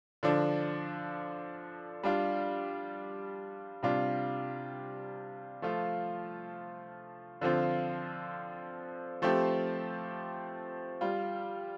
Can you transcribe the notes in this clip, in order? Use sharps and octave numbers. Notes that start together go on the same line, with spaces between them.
D3 F3 D4
G3 D4 F4
C3 G3 D4 F4
F3 A3 F4
D3 F3 C4 F4
F3 A3 C4 G4
G3 F4